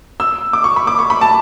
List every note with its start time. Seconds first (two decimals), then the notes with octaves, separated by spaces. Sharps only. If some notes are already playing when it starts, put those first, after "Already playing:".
0.20 E6
0.53 D6
0.64 C#6
0.76 B5
0.87 D6
0.99 C#6
1.10 B5
1.21 A5